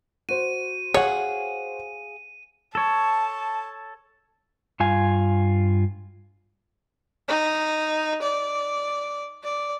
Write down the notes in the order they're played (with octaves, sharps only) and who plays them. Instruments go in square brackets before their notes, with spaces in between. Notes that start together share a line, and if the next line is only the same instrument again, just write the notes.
[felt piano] F#4 C5 [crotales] D#7
[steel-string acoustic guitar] G#4 F5 F#5 [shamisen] C#5
[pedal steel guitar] A4 C#5 [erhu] A5
[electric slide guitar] G2 F4 G#5
[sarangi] D#4
D5
D5